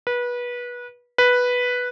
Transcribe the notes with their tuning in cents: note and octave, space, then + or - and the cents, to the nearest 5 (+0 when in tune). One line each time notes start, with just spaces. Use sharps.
B4 -25
B4 -5